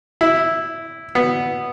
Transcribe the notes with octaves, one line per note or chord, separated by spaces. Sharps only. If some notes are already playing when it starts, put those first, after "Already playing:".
E4
B3